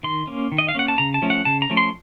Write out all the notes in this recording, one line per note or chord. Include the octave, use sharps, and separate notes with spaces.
D#3 C6
A#3 C#4
D#3
D#5
F5
A#3 C#4 F#5
A5
C#3 A#5
A5
F3 A3 C#4
F#5
C#3 A5
A#5
F3 A3 C#4
C6